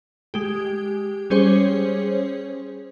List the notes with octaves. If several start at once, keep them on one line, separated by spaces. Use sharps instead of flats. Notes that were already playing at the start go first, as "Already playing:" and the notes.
G#3 G4
G3 C#4 G#4 C5 C#5